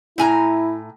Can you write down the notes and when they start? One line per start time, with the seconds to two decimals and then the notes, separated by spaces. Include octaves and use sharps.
0.18 A2 E4 G#5 A#5